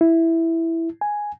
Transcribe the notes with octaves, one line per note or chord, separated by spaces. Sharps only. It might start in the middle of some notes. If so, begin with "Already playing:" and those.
E4
G#5